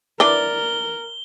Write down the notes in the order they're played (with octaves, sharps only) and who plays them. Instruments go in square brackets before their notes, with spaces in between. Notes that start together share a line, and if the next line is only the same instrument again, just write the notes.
[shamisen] E3 D4 B4 [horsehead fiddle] A#4 [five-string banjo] D5 [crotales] G7